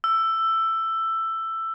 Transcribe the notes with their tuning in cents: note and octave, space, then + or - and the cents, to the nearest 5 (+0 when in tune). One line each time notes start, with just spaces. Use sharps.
E6 +10